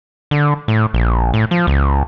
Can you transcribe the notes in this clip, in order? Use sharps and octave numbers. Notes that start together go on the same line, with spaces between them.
D3
A2
A#1
A2
F3
C#2